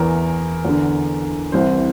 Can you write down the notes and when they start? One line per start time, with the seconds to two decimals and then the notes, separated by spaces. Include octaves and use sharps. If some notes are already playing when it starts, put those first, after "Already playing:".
Already playing: E2 E3 A#4
0.65 E2 D3
1.52 C2 C3 E3 C5